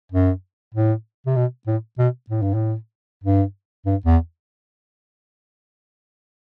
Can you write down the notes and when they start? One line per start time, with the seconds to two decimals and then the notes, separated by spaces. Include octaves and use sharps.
0.12 F#2
0.74 A2
1.27 C3
1.36 B2
1.67 A2
1.99 B2
2.30 A2
2.42 G2
2.54 A2
3.24 G2
3.86 G2
4.06 E2